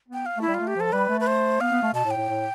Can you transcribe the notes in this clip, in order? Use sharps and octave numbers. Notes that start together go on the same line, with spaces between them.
B3
G5
F5
A3 E4
G3
F4
A3
G4
F3 A4
G3 B4
A3
B4
C5
B3 F5
B3
A3
B2 A5
A2
G5
A2
A2